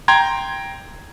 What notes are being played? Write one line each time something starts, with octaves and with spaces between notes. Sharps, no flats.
G5 A#5 C6 G#6